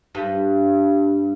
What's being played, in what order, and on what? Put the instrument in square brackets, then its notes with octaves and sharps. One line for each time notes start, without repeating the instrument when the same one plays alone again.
[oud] G2